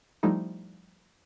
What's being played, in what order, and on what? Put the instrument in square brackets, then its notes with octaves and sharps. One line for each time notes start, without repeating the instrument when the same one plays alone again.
[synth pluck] F3 G3 A3 D#4 E4